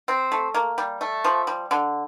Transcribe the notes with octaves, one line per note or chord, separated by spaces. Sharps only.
C4
A3
A#3
G3
A3
F3
G3
D3